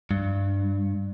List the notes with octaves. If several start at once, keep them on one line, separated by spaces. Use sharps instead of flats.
G2